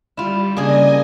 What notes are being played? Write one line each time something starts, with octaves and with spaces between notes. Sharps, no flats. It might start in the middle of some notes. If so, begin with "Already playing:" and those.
G3 E4 F4
C#3 A#3 D4 G#4 D#5 G#5